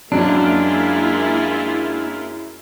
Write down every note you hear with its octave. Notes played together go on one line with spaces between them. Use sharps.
F#2 G#3 A#3 D4 E4 F4